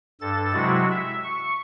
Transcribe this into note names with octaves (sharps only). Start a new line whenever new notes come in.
G2 A4 A6
C3 F#3 G#3 E4 F#4
E5
C#6